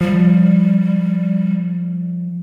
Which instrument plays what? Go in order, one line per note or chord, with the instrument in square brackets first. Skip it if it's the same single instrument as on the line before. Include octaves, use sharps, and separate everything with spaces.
[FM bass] F3 [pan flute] G3